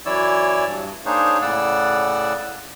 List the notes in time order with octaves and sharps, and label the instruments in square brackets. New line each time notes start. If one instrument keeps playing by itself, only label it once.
[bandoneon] F#2 E3 E4 C#5 D5 E6
G2
A#3 D4 D#4 G#4 C5 C#5
A2 C#3 D5 F#5 E6